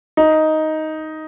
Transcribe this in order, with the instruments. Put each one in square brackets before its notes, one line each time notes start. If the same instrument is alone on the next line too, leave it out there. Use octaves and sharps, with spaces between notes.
[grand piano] D#4